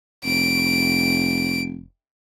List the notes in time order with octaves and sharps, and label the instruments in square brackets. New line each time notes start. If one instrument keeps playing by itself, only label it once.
[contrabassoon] F1 [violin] D7